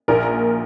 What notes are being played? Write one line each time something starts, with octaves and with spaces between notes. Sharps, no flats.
A#1 A#2 A#4